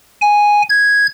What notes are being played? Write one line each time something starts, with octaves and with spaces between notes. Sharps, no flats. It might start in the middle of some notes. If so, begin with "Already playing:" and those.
G#5
G#6